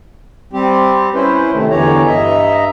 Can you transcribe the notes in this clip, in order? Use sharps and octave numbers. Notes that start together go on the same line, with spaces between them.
G3 C4 G4
C#4 E4 B4 C5
C3 D#3 A3
E2 D3 E3 G4 C#5 A#5
G2 D#5 E5 A#5